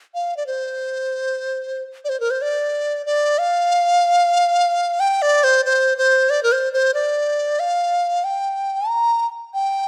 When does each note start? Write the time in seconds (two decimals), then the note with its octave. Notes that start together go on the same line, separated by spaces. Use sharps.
0.14 F5
0.37 D5
0.47 C5
2.05 D5
2.09 C5
2.20 A#4
2.31 C5
2.42 D5
3.06 D5
3.38 F5
5.00 G5
5.22 D5
5.44 C5
5.65 C5
5.98 C5
6.30 D5
6.43 A#4
6.52 C5
6.73 C5
6.94 D5
7.60 F5
8.24 G5
8.89 A#5
9.54 G5